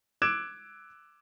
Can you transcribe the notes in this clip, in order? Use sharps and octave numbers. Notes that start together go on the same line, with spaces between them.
D6 E6 F#6 G#6 D7 E7